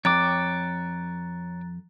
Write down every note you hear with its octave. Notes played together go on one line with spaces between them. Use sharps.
F2 C#5 G5 A#5 D6 F#6 A6